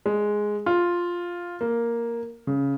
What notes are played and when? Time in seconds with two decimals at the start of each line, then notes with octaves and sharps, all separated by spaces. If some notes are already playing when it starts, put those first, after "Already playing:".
0.06 G#3
0.66 F4
1.61 A#3
2.47 C#3